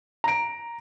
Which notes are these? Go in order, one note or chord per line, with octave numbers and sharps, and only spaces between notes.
A#5 D7